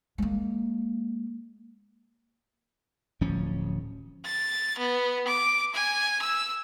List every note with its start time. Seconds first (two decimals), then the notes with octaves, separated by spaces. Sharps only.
0.18 G#3 A#3
3.21 D1 F3 C#4
4.25 A6
4.79 B3
5.27 D6
5.74 G#5
6.22 E6